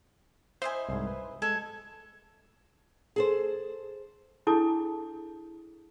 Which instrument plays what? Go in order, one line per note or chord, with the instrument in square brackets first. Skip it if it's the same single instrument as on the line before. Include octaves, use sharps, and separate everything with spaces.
[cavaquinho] E4 D#5 G#5 [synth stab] C5
[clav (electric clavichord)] C2 G#2
B4
[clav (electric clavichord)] G#3 [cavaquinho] A4 [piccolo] G#6
[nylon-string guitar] G#4 A4 C5
[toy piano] D4 E4 G#4 A4 A5 D6